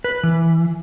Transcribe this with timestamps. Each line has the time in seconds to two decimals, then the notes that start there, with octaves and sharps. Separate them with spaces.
0.04 B4
0.23 E3